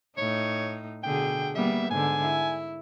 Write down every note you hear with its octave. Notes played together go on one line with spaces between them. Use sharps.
A2 D#4 C#5
B2 D3 G#4 G5
G3 A#3 B3 E5
G#2 D3 G#5
E4